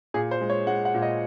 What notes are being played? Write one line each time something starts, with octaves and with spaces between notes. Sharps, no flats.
A#2 G#4
C5
G#3
C#5
G#3 F#5
F#5
A#2
D#5